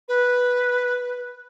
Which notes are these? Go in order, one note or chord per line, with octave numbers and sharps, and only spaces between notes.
B4